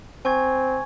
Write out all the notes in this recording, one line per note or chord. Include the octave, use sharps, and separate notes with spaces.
C4 G#5 C#6 G#6